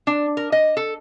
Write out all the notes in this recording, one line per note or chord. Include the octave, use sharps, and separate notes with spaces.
D4
A#4
D#5
A4